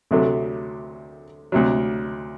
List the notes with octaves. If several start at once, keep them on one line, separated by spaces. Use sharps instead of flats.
D2 C3 F#3 A3
D2 C3 F#3